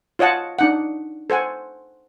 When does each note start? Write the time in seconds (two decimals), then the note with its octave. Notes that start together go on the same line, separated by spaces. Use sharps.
0.19 F4 C#5 D#5 F#5 A5
0.58 D4 D#4 F#5
1.30 A4 C5 F#5 G#5